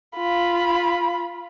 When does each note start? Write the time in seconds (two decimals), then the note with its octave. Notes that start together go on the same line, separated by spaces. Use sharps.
0.17 F4 B5